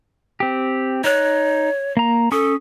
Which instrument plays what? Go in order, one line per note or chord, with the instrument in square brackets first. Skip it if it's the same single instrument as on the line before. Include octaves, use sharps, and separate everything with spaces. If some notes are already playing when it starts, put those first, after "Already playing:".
[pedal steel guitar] C4 G4
[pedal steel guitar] D#4 F#6 [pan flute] C#5
[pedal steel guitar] A#3 A#5
[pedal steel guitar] C#4 C#6 D#6 [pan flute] A4